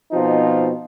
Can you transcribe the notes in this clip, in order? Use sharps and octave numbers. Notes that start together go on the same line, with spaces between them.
B2 F3 C4 D#4 F4